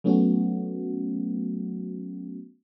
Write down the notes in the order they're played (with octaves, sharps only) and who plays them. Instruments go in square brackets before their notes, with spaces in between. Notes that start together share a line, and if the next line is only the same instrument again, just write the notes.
[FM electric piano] F#3 A3 B3 C#4 F#4